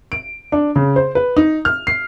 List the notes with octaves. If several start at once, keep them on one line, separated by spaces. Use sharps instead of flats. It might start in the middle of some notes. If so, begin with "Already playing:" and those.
D7
D4
C#3
C5
B4
D#4
F6
C7